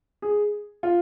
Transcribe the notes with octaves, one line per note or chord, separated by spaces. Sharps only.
G#4
F4